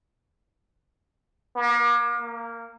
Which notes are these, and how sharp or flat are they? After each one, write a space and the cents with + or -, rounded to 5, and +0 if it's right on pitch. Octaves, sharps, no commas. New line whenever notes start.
A#3 +40
A#3 -10